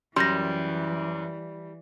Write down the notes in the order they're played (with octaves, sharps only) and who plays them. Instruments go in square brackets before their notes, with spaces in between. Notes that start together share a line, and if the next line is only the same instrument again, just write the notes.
[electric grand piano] F#2 [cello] E3 [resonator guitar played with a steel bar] G3 [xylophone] C6 G6 A#6